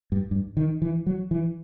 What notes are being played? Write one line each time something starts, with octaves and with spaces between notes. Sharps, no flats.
G2
G2
D#3
E3
F#3
E3